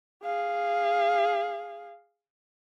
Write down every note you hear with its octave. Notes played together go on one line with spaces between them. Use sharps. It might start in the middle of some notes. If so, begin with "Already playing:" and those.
G#4 F5